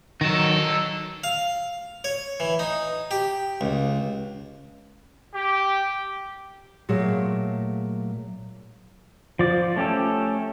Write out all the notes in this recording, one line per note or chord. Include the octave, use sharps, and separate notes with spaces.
D#3 F#3 D#4 A4
F5
C#5
E3
D#4
G4
C#2
G4
A#2 F#3 A3 G#4 F5
F3 D5
A3 C#4 G4 A4